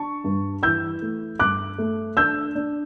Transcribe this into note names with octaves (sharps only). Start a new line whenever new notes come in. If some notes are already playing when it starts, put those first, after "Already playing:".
Already playing: D4 A5 C#6
G2
E3 E6 G6
A3
G2 D6 F#6
A3
D4 E6 G6
D4